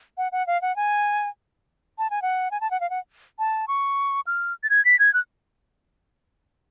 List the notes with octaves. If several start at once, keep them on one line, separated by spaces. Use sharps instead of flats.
F#5
F#5
F5
F#5
G#5
A5
G#5
F#5
G#5
A5
F#5
F5
F#5
A5
C#6
F6
A6
G#6
B6
G#6
F#6